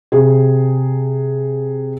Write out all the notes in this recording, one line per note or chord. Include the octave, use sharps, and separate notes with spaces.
C3 G#4